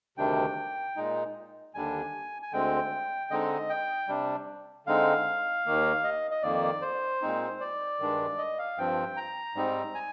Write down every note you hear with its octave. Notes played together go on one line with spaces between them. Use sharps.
D2 C3 D#3 G3 D4 G5
A#2 G#3 D#4
D#2 D3 G3 D4 G#5
G#5
D2 D3 G#3 C4 G5
D3 G#3 C4 D#4 D#5
G5
C3 G3 D4
D3 G#3 C4 D#4 F5
D#2 D#3 A#3
D#5
D#5
F2 D#3 A#3 D5
C5
A#2 G#3 C4 D#4
D5
G2 D#3 G#3 D4
D#5
F5
G2 F3 C4 G5
A#5
G#2 G3 C4 D#4
G#5